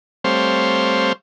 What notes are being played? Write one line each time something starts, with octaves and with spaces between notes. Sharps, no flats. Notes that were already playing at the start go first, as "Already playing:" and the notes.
G3 A3 C4 C5 C#5 F5